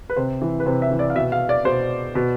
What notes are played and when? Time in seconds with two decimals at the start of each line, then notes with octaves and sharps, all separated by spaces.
0.10 B4
0.16 C3 C5
0.42 E3
0.60 B4
0.66 C3 C5
0.82 E5
0.91 E3
0.99 D5
1.10 F5
1.15 B2 E5
1.32 F5
1.49 D5
1.65 B2 C5
2.15 B2